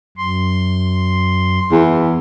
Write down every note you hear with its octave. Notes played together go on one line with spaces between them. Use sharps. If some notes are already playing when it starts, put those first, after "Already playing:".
F#2 C6
E2